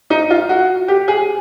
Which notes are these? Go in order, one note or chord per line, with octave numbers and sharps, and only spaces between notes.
D#4
F4
F#4
G4
G#4